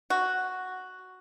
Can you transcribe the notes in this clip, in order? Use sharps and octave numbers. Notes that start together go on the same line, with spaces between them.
F#4